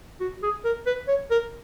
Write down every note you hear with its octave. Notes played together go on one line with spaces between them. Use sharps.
F#4
G#4
A#4
B4
C#5
A#4